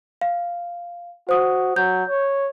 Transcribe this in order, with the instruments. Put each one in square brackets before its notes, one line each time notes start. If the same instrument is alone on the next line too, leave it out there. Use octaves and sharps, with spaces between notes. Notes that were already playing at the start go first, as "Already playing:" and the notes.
[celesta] F5
[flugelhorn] F#4 [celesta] C5 D#6
[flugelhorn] F#3 [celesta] G6
[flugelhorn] C#5